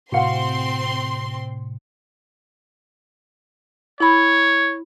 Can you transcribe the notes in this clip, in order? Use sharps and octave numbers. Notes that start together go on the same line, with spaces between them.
A2 C3 C4 F#4 F5 F#5 C6 C#7
E4 C#5 B5